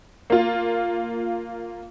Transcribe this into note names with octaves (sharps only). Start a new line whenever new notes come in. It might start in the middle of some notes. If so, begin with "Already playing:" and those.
A#3 F4